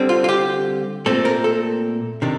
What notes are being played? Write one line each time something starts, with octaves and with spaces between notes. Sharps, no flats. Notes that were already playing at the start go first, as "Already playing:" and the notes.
Already playing: D3 G3 C4
F4
F4
G4
A#2 A3 C4 A4
A#4
A4
C3 D#3 D4